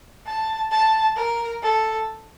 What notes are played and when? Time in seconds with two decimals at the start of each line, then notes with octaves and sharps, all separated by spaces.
0.26 A5
0.72 A5
1.16 A#4
1.63 A4